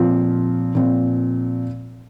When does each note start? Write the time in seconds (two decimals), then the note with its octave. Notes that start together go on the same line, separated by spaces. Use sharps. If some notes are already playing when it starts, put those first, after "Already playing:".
Already playing: A#2 F3 C4
0.75 A#2 F3 C4